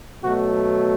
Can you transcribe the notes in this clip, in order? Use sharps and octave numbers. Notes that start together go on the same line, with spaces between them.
B2 F#3 A3 F#4